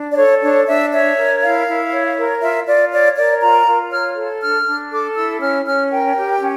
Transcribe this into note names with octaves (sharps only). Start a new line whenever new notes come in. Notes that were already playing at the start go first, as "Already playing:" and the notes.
Already playing: D4
D5
A4 C#5
D4 C#5
D4 E5
C#5 E5
A#4
E4 F5
E4
C#5
A#4
F4 E5
F4 D5
C#5 D5
A#4 D5
F4 A#5
F4
C#5 F6
A4
D4 F6
D4
A4 D6
E4 E6
C#4 F6
C#4 F6
A#4 G5
G4
C#4